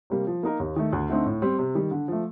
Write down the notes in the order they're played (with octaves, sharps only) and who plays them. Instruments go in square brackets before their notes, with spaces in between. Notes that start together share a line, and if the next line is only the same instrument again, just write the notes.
[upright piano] C3 G3 A#3
F3
A#3 D#4 A#4
D#2
D#3 A3
D2
D3 A3 C4 D#4
A2
G3 C4
C3
D#3 G3
D3
F3 A3